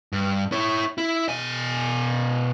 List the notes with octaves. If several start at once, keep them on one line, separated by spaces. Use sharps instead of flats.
G2
E4 C#5
E4
B2 G#5